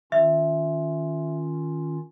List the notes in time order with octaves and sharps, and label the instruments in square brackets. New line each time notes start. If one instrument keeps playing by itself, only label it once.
[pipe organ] D#3 C#4 F4 [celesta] E5